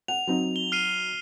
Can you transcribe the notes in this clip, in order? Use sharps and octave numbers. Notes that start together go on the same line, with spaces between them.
F#5 F7
F#3 C4 D#4
G7
F6 C7 D#7